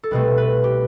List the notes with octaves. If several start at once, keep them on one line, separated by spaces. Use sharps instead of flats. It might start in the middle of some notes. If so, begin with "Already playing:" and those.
A4
C2 B2 A3 C4 B4
B4
G4